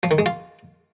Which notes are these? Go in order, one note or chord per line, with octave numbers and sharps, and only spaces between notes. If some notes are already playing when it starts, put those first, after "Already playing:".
F3
D#3
G#3
F4